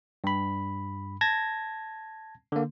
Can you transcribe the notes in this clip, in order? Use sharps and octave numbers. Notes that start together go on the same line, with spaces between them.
G2 B5
A5 G#6 A#6
D3 A#3